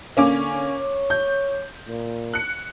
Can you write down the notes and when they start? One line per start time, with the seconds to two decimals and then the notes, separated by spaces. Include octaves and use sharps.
0.17 D3 A#3 C#4 D6
0.77 C#5
1.10 G6
1.87 A#2
2.34 F#6 C#7